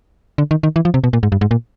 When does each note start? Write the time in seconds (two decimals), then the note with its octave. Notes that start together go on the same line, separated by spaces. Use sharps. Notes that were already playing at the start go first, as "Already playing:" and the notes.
0.38 D3
0.51 D#3
0.63 D#3
0.76 E3
0.85 F3
0.94 C3
1.04 B2
1.13 A#2
1.23 G#2
1.32 G2
1.41 G#2
1.51 A#2